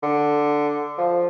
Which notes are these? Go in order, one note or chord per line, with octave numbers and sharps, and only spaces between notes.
D3
F3